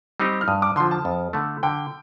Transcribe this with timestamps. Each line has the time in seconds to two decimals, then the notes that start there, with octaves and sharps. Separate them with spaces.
0.20 G3 C4 D#4 G4
0.41 F6
0.47 G2 D#6
0.62 D6
0.76 D3 C6
0.80 F3
0.91 A5
1.05 F2
1.33 D3 A3
1.63 D3 G5